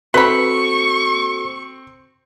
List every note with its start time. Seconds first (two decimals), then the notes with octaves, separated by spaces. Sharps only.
0.14 C4 F#4 A4 B4 C5 B5 C#6